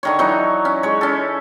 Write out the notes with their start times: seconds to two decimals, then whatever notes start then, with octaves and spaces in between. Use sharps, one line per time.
0.03 D3 D#3 C#5
0.19 E3 F#3 D#4 C#5
0.65 C#4
0.83 G#3 C#5
1.01 C#4 A4